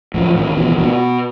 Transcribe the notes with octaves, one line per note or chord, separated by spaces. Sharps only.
A2 F3
F3
A2 D#3
D#3
B2 E3
E3
B2 D#3
A#3